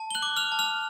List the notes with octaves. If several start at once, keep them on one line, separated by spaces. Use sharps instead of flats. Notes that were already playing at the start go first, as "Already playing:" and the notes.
Already playing: A5
G7
F#6 F#7
D6
F6 F7
A5
F6 F7